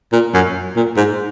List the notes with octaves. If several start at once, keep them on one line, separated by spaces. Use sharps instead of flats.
A#2
F#2
A#2
G#2